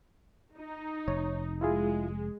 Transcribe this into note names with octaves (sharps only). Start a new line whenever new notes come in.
D#4
F1 C#5
G#3 E4 F4 G#4